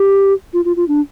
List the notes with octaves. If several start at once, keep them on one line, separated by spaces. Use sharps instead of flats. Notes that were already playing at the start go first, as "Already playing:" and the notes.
Already playing: G4
F4
F4
F4
D4